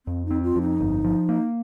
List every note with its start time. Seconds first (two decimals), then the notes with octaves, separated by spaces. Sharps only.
0.06 F2 C4
0.25 D#4
0.31 C4
0.43 F4
0.56 F2
0.62 D#4
0.81 G1
1.04 F3
1.29 A#3